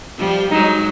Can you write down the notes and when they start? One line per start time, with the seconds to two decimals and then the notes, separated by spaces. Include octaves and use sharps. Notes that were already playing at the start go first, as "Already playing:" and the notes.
0.18 F3 G3
0.51 F#3 G#3 D#4